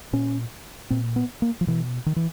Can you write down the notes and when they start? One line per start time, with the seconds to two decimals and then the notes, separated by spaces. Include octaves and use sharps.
0.13 A#2 C#4
0.90 A#2 C4
1.16 B3
1.42 A#3
1.61 F3
1.67 B2 E3
2.06 D#3
2.16 E3